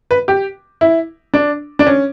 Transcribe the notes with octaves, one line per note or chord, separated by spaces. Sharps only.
B4
G4
E4
D4
D4
C#4